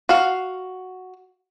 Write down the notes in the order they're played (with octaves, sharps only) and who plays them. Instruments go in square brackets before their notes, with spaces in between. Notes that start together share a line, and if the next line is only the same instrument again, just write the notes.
[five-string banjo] F#4 F5